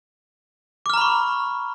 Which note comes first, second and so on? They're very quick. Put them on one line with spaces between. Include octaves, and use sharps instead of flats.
D6 F6 A#5 B5 C#6